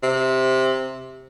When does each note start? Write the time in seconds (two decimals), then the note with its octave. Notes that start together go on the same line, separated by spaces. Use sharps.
0.03 C3